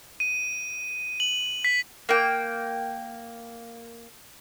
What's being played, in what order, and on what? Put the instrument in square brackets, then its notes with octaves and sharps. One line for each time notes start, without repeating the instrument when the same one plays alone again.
[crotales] D#7
F#7
B6
[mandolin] A#3 G5